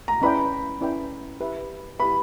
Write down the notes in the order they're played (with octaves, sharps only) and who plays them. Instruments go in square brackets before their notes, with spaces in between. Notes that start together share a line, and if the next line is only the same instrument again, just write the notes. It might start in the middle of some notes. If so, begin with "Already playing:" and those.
[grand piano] A#5
[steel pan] C#4 E4 B4 D5 G5 [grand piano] B5
[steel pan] C#4 E4 B4 D5 G5
E4 G4 B4 E5
[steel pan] E4 G4 B4 E5 [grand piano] B5